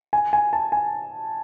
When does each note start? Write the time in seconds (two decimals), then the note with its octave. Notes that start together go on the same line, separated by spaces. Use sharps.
0.13 G#5
0.33 G#5
0.53 A5
0.72 G#5